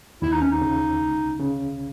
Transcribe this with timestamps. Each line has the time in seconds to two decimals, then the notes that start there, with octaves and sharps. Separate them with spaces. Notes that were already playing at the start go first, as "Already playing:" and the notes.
0.22 D#2 E4
0.32 D#4
0.41 C#4
0.51 D#4
0.62 C#3
1.01 C#2
1.40 C#3